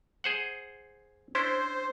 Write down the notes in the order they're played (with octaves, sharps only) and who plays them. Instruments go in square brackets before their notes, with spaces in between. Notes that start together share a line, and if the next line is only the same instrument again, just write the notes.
[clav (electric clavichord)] G#4 C5 F#5
[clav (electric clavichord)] C#4 D4 E4 [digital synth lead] C5